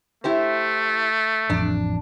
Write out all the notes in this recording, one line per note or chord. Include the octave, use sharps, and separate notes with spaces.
A3 E4 G4 C5
A1 F2 D4